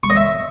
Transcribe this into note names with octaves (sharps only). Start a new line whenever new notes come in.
C#6
D#5
E5